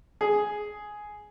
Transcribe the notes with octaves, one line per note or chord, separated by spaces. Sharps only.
G#4